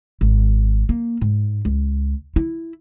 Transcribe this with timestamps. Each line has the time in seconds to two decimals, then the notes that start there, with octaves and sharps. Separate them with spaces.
0.21 G#1
0.89 A#3
1.21 G#2
1.65 C#2
2.36 E4